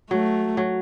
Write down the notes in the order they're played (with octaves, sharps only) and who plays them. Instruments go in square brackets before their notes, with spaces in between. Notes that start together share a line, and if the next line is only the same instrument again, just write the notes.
[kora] F#3 [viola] A3
[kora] F#3